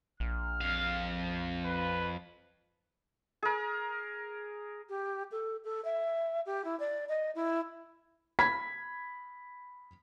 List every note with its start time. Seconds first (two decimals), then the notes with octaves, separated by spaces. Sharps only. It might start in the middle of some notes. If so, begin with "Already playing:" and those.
0.20 A#1 F6
0.61 F2 F5
1.65 B4
3.42 G#4 A#4
4.89 G4
5.32 A4
5.65 A4
5.85 E5
6.46 G4
6.65 E4
6.80 D5
7.09 D#5
7.35 E4
8.39 B5 G#6 B6